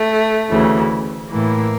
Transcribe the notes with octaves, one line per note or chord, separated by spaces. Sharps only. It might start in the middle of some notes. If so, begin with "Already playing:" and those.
Already playing: A3
D2 C#3 E3
A2 E3 A#3